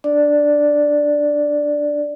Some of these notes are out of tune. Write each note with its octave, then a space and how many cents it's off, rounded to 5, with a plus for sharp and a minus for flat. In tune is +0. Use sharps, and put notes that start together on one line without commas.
D4 +0 D5 +0